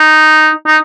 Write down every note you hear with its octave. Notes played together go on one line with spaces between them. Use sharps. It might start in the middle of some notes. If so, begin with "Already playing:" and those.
Already playing: D#4
D#4